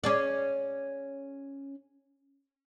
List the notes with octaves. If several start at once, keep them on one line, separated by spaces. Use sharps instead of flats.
C#4 G#4 D5